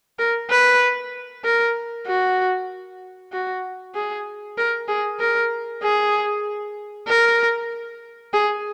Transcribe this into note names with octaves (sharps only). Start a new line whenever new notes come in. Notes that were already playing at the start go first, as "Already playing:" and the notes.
A#4
B4
A#4
F#4
F#4
G#4
A#4
G#4
A#4
G#4
A#4
G#4